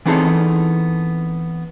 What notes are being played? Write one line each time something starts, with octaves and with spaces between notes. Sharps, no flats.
E3 B3 C4 D#4 G#4 A4